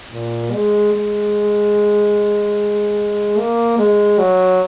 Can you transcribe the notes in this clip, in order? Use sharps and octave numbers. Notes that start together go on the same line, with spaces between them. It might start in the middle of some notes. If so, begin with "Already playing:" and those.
A#2
G#3
G#3
A#3
G#3
F#3